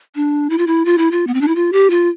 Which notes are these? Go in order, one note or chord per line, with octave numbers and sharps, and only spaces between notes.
D4
E4
F4
E4
F4
E4
F4
B3
C4
D4
E4
F4
G4
F4